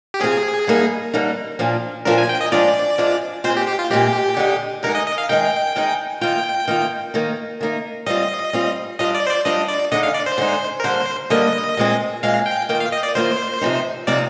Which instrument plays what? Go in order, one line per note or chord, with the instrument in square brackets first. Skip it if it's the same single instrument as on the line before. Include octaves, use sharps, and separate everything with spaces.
[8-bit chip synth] G4
[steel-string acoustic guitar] C3 F3 C4 F4 [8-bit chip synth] G#4
[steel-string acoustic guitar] D3 G3 A#3 D#4
D3 G3 A#3 D#4
A#2 F3 A#3 D4 F4
[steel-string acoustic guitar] A#2 F3 A#3 D4 F4 [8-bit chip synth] A#4
[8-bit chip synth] G#5
G5
D#5
[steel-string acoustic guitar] F3 G#3 D4 F4 [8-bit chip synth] D5
[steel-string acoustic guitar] F3 G#3 D4 F4
[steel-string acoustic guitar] A#2 G#3 C4 [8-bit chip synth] C5
[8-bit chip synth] G4
G4
F4
[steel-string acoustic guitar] A#2 G#3 C4 [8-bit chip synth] G4
[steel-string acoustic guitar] D3 G#3 D#4
[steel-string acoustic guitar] D3 G#3 D#4 [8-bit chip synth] A#4
[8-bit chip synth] D#5
D#5
F5
[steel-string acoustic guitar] D#3 G#3 D#4 [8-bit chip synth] G5
[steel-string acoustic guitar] D#3 G#3 D#4
[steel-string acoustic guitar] D#3 A#3 F4 [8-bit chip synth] G5
[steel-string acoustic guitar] D#3 A#3 F4
D#3 A#3 D#4
D#3 A#3 D#4
[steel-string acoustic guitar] G3 C4 F4 [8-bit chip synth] D#5
[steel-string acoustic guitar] G3 C4 F4
[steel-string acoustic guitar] G3 D4 F4 [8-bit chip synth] D#5
[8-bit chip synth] D5
C5
D5
[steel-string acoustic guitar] G3 D4 F4 [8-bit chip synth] D#5
[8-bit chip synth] D5
[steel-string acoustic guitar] D3 G#3 D#4 [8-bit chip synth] D#5
[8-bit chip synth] F5
D5
C5
[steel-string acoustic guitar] D3 G#3 D#4
[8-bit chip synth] A#4
[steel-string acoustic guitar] D3 G3 A#3 [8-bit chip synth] C5
[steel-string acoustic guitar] D3 G3 A#3 [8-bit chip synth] D#5
[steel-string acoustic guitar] A#2 G#3 C4
[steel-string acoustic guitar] A#2 G#3 C4 [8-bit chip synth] F5
[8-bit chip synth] G5
[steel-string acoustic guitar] D#3 A#3 F4 [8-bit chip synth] G5
[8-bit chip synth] F5
D#5
D5
[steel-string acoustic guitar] D#3 A#3 F4 [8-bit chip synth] C5
[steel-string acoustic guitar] C3 F3 C4 D#4
[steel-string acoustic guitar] C3 F3 C4 D#4 [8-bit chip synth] D5